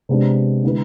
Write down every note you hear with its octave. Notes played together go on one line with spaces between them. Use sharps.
C3 G#3 B3 D4
D3 G#3 B3 E4 B4